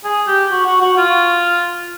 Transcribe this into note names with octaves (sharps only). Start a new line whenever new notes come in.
G#4
G4
F#4
F#4
F#4
F4